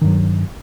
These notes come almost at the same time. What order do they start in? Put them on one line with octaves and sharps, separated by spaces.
D#3 G2 F#3